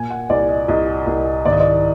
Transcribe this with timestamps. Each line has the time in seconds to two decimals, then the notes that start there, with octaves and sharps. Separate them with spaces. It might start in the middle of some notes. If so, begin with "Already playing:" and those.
Already playing: A#2 G#5
0.10 F#5
0.30 C2 D5
0.49 D#5
0.68 C2 D#5
1.07 C2
1.45 G#1 D5
1.53 D#5
1.60 D5